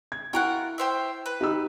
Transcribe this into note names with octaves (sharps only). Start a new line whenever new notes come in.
G#6
E4 F4 A#4 F#5 G5 C#6
G4 C5 E5
B4
D#4 G4 E6